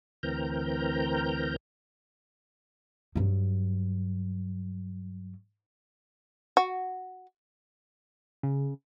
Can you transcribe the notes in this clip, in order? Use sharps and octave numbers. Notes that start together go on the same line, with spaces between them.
D2 E3 C4 A#4 A#5 G6
G2 F#3
F#4
C#3